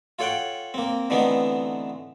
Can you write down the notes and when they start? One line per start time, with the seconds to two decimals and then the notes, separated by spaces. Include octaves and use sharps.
0.19 F4 A4 C#5 F#5 G5
0.74 A#3 C4
1.10 D3 E3 A3 B3 C4 D#4